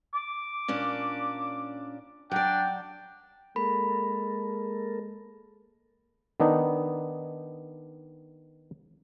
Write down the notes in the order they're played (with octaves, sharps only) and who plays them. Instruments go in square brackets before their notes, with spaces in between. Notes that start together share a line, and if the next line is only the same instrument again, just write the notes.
[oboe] D6
[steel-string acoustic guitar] A#2 C#4 D4
[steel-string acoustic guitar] F#3 D5 [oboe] D4 [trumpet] G5
[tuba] G#3 [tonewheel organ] A#3 A4 A#4 [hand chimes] B5
[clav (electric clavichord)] D#3 B3 D4 D#4